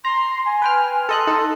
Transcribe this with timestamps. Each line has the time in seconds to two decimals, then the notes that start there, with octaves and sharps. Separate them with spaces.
0.05 A#5 C6
0.46 G#5
0.62 B4 G5 F6
1.09 A4 D#5 C6 F#6
1.27 D#4 A4